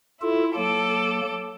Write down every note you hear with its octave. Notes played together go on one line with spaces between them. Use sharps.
E4 F4 A4
F#3 A#3 A4 D6